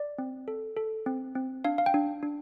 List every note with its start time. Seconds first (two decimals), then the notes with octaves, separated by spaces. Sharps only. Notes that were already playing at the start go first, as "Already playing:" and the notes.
Already playing: D5
0.18 C4
0.48 A4
0.77 A4
1.06 C4
1.35 C4
1.64 D4 F5
1.78 F5
1.86 G5
1.94 D4
2.23 D4